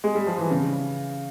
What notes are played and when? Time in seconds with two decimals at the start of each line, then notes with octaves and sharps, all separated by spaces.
0.04 G#3
0.15 G3
0.27 F3
0.38 E3
0.50 C#3